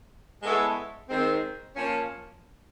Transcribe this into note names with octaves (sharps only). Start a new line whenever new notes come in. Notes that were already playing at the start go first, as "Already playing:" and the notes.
G#3 B3 E4 A4 C#5
D#3 G#3 C4
F3 A#3 C#4